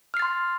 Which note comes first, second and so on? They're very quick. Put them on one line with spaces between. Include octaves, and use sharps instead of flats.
F6 C7 A6 C6